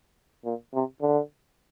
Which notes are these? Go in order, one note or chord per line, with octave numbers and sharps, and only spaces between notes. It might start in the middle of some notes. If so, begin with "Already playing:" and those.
A#2
C3
D3